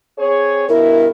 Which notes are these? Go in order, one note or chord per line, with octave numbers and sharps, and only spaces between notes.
C4 G#4 C#5
G2 B2 E4 A#4